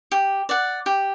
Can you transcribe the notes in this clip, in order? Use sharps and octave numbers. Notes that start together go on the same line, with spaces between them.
G4
D5 F#5
G4